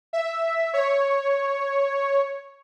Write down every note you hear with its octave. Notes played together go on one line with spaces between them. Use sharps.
E5
C#5